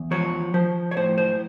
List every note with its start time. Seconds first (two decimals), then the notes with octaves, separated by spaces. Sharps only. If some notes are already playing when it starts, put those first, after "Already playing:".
Already playing: E2
0.11 F3 C#5
0.54 F3 C5
0.91 C#5
0.97 A2 C5
1.18 C5